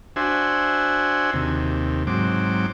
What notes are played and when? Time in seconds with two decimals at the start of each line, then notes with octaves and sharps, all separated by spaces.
0.16 D4 F#4 C5 E5 G#5
1.34 D#2 C3
2.07 G#2 F#3 C4 D6